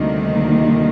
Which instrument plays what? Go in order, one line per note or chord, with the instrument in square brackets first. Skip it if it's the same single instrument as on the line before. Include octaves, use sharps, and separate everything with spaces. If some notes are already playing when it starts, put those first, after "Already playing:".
Already playing: [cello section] D2 C3 D#3 G3 A#3